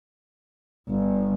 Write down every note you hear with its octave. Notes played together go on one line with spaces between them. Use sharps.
G1